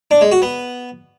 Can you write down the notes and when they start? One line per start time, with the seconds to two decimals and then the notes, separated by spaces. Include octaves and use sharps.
0.11 D4
0.21 G#3
0.32 F#4
0.42 B3